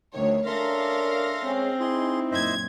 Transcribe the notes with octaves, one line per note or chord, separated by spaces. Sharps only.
D2 D#3 F3 F#3 C#5
C#4 D4 A4 A#4 E5 F5 C6 A#6
G#3 C4 C#4
D#4 E4 G#4 C6
F#2 A#2 C5 D#5 E5 G#6